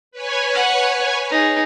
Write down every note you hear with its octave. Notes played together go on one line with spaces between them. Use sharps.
B4 C#5 G#5
F#5
D#4 G#4